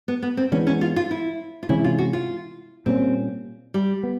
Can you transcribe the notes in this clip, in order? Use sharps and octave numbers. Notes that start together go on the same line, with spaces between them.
B3
B3
C4
E3 G#3 B3 C#4 D4
C#4
F4
F4
E4
F4
C3 E3 G#3 C#4 E4
F4
F#4
F4
A#2 G3 A#3 C4 C#4
G3
B3